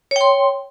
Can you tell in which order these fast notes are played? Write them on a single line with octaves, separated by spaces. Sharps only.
C#5 G5 C6